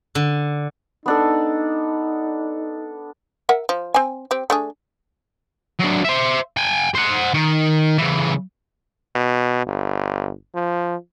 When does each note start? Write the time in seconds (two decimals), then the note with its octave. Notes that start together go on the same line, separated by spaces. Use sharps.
0.15 D3
1.06 B3 D4 D#4 A4
3.49 A#4 E5 F#5
3.69 F3
3.94 C4 G#5
4.31 C4 G4
4.50 A3 D4 G#4
5.79 F#3 D4
6.04 C5 E5
6.57 G5 G#5
6.95 C5 F#5
7.34 D#3
7.98 C#3 E3
9.15 B2
9.66 G1
10.55 F3